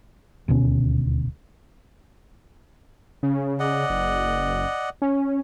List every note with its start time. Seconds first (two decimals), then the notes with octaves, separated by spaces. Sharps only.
0.48 D#1 D2 B2 C#4
3.23 C#3
3.59 D5 D#5 F#5
3.90 F#1
5.02 C#4